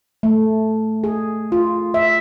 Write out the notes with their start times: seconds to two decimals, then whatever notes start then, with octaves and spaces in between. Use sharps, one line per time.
0.23 A3
1.04 G#4
1.52 F4
1.94 E5